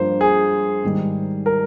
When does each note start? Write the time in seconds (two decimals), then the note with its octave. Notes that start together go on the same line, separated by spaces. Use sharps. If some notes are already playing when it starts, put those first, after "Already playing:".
Already playing: G2 F3 A#3 C5
0.21 G#4
0.83 G#2 D#3 G3
1.46 A#4